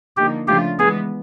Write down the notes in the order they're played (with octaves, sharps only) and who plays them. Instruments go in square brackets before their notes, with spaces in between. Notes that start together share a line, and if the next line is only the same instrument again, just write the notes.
[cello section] D3 F3 A#3 D#4 [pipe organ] G4
[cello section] C#3 F3 A3 D4 F4 [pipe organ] G4
[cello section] E3 G#3 B3 [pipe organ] G#4